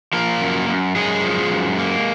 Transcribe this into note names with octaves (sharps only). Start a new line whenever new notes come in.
F3 A#3 A#4
F#2
F#2
F#2 G#3 G#4
F3
F#2
A#3